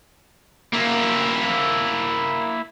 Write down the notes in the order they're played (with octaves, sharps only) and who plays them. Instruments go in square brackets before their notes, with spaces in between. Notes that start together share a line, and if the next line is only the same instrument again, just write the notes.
[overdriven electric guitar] A#3 E4